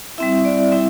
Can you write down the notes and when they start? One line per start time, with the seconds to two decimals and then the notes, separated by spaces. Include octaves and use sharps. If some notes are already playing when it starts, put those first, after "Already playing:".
0.18 G3 C4 E4 E5
0.45 D5
0.72 G3 C4 E4 E5